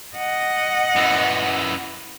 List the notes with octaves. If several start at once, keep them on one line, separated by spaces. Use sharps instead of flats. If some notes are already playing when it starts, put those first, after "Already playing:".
D#5 F#5
F#2 E3